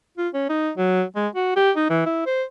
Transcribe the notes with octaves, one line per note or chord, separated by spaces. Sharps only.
F4
C#4
D#4
F#3
G#3
F#4
G4
D#4
E3
E4
C5